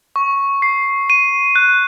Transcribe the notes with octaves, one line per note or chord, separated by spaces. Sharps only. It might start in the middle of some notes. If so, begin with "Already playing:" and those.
C#6
C7
D#7
F#6